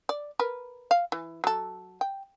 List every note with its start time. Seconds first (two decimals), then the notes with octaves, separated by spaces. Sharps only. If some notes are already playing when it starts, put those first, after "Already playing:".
0.09 D5
0.40 A#4 B4
0.91 F5
1.12 E3
1.44 F#3 A4
2.01 G5